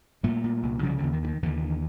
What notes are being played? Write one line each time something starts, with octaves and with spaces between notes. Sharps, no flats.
A#2 G3 A3
A#2
C2
C#3 F3 G3
D3
D#2
D#3
C#3
D#3
D#2 D3 E3
D3